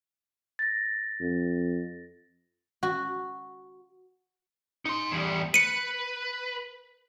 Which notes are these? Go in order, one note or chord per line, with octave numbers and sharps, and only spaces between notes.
A6 A#6
F2
F#4
D#4 C6
E2 G3
B4 C#7 D#7